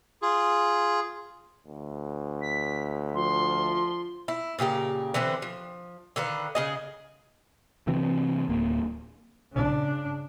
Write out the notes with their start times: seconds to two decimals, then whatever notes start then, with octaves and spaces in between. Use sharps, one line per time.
0.22 F4 G#4
1.67 D2
2.42 B6
3.15 F3 C6
4.28 E4
4.59 A#2 C#3 G4 A#4
5.14 D3 E3 C4 B4
5.42 F3
6.16 D3 D#3 B4 F5
6.55 C#3 G#4 D#5
7.87 C3 E3 F#3 C4
8.49 D1 A#3
9.52 C#3 D4